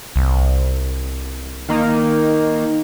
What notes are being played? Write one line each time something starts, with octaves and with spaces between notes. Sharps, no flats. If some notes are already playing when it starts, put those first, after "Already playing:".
C2
D#3 A#3 D#4